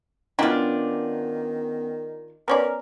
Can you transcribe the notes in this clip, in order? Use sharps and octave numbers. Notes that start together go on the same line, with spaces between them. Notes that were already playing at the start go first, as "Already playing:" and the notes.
D#3 B3 C#4 D4 E4 F4 D#5 G5
B3 C#4 A#4 D5